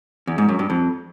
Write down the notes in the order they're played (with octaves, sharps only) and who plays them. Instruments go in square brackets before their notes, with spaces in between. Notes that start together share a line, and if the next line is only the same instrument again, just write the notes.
[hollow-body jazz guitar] E2
G#2
F#2
G2
F2